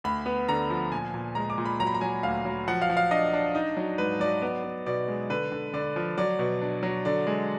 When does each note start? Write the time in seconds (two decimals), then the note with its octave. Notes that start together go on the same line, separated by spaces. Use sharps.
0.04 D2 B5
0.26 B3
0.49 D3 A#5
0.70 F3
0.92 A#2 G#5
1.14 A#2
1.35 G#3 A#5
1.50 D6
1.58 A#2
1.65 B5
1.80 F#3 A#5
1.87 B5
1.94 A#5
2.01 F#3 G#5
2.23 D2 F5
2.45 F#3
2.68 F3 F#5
2.82 F5
2.90 F3
2.97 F5
3.11 D4 D#5
3.33 D4
3.55 D#4
3.77 F#3
3.98 G#2 B4
4.20 F#3 D5
4.42 B3 D5
4.64 B3
4.86 B2 D5
5.08 G#3
5.30 D3 B4
5.52 D3
5.74 D3 D5
5.96 F3
6.18 F#3 D5
6.39 B2
6.62 D4
6.83 F#3
7.05 D3 D5
7.27 G#3